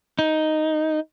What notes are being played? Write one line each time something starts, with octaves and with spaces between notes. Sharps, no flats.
D#4